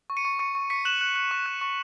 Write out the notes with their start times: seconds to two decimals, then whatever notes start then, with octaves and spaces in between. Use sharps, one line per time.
0.10 C#6
0.17 C#7 D#7
0.25 C#6
0.39 C#6 C#7 D#7
0.55 C#6
0.70 C#6 B6 C#7
0.85 F#6 E7 F#7
1.01 F#6
1.16 F#6
1.31 C#6
1.46 F#6
1.61 C#6